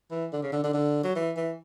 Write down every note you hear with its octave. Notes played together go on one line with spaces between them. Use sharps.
E3
D3
C#3
D3
D3
D3
F#3
E3
E3